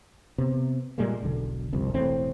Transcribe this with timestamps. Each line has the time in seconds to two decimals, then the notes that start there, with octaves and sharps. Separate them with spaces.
0.38 C3 B3
0.98 A#2 G3 G#3 A#3
1.23 E1 B1 D3
1.73 G1 C2 F2
1.94 E1 A2 E3 C4